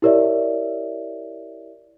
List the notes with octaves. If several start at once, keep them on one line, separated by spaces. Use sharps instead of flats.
E4 G4 A#4 C#5 D5 E5